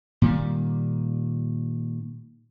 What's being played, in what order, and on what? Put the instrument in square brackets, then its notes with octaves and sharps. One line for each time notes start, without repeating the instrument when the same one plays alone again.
[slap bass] A#2 D#3 G3